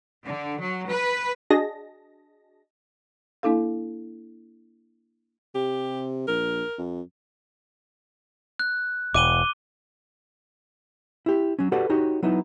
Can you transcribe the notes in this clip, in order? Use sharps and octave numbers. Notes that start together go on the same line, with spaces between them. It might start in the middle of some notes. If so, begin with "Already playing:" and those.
D3
F#3
B4
D4 F#4 G#4 D#5 A5 A#6
A#3 D4 E4 A4 F5
C3 G4
A#1 A#4
F2
F#6
E1 D6 D#7 G7
E4 G4
F#3 C#4
F#4 G4 A4 B4 D5 F#5
D#4 F#4 G4 C#5
F#3 B3 D#4 E4